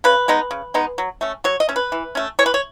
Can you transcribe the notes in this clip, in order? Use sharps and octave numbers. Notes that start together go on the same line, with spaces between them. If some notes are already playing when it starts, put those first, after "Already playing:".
C#3 B4
G#3 B3 D#4
C#3
G#3 B3 D#4
F#3
A3 C#4
F#3 C#5
D#5
A3 C#4
B4
E3
A3 C#4
E3 C#5
B4
C#5